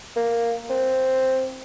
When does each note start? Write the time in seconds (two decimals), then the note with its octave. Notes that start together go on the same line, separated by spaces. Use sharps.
0.16 A#3
0.70 C4